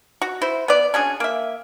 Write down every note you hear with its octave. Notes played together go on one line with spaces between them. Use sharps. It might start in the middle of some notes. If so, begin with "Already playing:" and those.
F#4
E4 C5
B3 D5
C#4 D4 F#4 G#4
A#3 E5